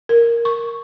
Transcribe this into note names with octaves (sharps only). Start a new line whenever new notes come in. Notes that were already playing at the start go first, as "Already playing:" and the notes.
A#4
C#6